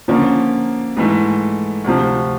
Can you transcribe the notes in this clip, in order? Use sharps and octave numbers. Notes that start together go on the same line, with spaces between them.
D3 F3 A#3 C#4
G#2 E3 A3
D2 C3 F3